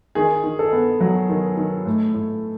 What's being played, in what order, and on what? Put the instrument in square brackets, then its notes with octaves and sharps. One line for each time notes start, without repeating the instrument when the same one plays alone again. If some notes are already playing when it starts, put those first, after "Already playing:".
[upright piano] D#3 G#4
D#3
A4
B3
F#3
D#3
D#3
A2
A2